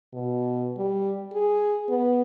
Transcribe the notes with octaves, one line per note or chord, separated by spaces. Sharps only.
B2
G3
G#4
B3